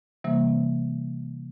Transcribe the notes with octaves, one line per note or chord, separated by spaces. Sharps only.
C3 E3 G3 A#3